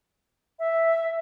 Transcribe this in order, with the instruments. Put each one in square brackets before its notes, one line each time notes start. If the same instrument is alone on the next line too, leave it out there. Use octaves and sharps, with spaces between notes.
[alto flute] E5